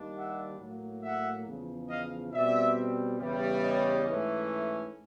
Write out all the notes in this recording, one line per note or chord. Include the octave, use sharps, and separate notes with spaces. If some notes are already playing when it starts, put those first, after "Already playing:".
Already playing: D#2 D#3 G3 A#3 D4
E5 F#5
A2 F#3 A#3
E5 F#5
E2 C#3 F3
D#5 F5
B2 G3 C4 D5 E5
E2 C#3 E3 G3
C#5 D#5
G#2 E3 A3 C#4